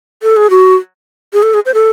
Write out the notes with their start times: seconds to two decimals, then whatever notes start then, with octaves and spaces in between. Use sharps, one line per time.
0.23 A4
0.37 G#4
0.50 F#4
1.33 G#4
1.43 A4
1.54 G#4
1.66 C5
1.74 A4